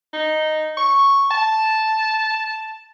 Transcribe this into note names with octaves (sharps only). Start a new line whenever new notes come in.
D#4
C#6
A5